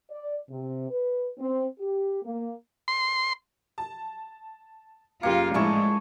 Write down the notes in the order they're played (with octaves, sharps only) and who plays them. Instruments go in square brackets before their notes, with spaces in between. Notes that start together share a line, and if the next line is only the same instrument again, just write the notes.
[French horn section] D5
C3
B4
C4
G4
A#3
[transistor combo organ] C6
[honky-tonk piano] A5
[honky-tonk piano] F#1 G4 C#7 [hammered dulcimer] A#3 [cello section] F4
[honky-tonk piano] A#1 A2 [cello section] G#3 [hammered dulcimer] E4 A4 C#6